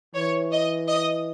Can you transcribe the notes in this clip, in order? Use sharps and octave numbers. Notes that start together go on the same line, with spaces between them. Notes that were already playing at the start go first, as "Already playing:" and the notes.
E3 C#5
D#5
D#5